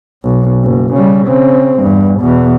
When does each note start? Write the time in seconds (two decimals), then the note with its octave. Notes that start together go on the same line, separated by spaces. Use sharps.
0.24 B1
0.64 F#1
0.94 C#3 G3
1.27 C#3 C4
1.80 E2 G2
2.20 E2 B2